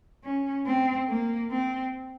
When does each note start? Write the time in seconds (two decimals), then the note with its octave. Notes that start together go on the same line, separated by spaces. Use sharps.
0.24 C#4
0.66 C4
1.08 A#3
1.50 C4